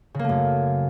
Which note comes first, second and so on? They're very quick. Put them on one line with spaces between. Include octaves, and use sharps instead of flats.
C#3 A#3 A3 F#2